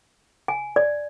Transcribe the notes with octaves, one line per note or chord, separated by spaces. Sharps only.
G#5
D5